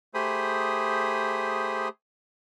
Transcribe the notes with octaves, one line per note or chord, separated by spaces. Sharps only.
A3 G4 G#4 C5 B5 D#6